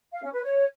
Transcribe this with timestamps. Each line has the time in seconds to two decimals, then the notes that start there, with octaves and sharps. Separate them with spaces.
0.12 F5
0.22 C#4
0.33 B4
0.43 C#5